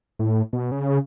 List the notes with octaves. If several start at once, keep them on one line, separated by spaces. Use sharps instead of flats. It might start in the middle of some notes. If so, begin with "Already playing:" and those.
A2
B2
C#3